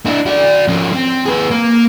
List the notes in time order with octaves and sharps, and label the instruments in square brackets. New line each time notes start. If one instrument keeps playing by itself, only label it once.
[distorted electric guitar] D4 E4
F#4 D5
F3 C#4
C4
G#4 B4
A#3